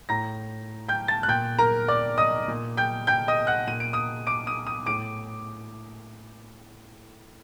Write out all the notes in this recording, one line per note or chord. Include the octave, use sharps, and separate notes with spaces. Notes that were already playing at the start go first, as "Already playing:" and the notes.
A2 A#5 A#6
G5 G6
A5 A6
F#6
A#2 G5 G6
A#4 A#5
D5 D6
D#5 D#6
A#2
G5 G6
G5 G6
D#5 D#6
F#5 F#6
A#2 D#7
D7
D#6 D#7
D6 D7
D#6 D#7
D#6 D#7
A2 D6 D7